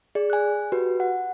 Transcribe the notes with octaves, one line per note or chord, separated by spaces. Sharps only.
G#4 D5
G#5 F#6
F#4 G4 B4
F#5